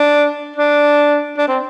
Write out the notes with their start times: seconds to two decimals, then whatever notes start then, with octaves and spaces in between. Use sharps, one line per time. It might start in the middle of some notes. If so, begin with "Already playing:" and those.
Already playing: D4
0.56 D4
1.37 D4
1.48 C4